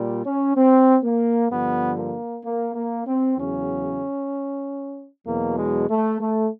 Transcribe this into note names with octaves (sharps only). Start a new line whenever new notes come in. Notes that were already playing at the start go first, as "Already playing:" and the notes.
Already playing: A#2 G3
C#4
C4
A#3
G2 D3 F3 B3
A#3
A#3
A#3
C4
E2 C#3 F#3 C#4
E2 B2 F#3 A#3
G#3
A3
A3